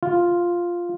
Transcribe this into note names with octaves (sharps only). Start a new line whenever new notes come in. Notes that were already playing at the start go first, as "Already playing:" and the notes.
F4